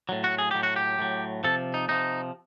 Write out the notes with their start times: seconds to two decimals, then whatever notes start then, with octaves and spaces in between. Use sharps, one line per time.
0.09 A2 F#3
0.24 F#4
0.38 G#4
0.51 A2 F#3 G4
0.63 F#4
0.76 G4
0.99 A2 F#3
1.44 C3 F3 A4
1.74 D#4
1.89 C3 F3 D#4